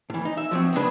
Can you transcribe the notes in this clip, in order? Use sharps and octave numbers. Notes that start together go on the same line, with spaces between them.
A2 E3
D#4
E5
F3 F#3 C4
B1 F2 C#3 G#3 D4 B4